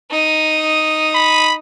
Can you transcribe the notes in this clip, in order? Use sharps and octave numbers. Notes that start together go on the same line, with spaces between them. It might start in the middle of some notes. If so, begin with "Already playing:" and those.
D#4 D#6
B5